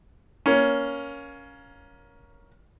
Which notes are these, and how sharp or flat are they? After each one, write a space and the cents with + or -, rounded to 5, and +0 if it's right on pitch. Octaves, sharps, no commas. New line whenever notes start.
A#3 +15 C#4 +10